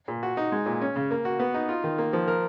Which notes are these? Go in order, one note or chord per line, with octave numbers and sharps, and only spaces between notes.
A#2
F#4
D#4
G#3
A#2
C#4
C#3
A#3
F#4
B3
D#4
F4
D#3
A#3
F3
A#4